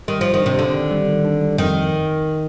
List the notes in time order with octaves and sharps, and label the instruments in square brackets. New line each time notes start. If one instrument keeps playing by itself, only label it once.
[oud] D#3 [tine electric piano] G3
[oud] F3 [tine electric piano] F4
[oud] D#3
[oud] C3 [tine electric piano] D4
[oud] D3 [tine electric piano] D4
[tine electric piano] D#3
G3
D#3
D4
G3
[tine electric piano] F2 [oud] D#3